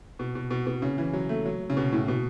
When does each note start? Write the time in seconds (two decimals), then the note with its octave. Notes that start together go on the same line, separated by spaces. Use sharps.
0.19 B2
0.35 B2
0.51 B2
0.67 B2
0.82 C#3
0.98 E3
1.13 F#3
1.29 A3
1.46 F#3
1.70 C#3
1.77 B2
1.92 A2
2.08 B2